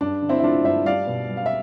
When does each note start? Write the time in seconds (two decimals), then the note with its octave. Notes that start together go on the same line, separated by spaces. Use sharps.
0.01 G2 D4
0.22 D3
0.29 C4 E4
0.40 E4
0.44 A3 D4 F4
0.64 G2 C5 E5
0.85 G3 D5 F5
1.07 B2
1.29 G3
1.37 F5
1.46 E5